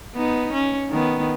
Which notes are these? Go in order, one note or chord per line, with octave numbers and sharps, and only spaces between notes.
B3 D#4
C#4
D#3 B3